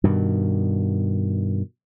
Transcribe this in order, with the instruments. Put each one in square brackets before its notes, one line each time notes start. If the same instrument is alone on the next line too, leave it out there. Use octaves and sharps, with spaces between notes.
[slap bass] G2 B2 D#3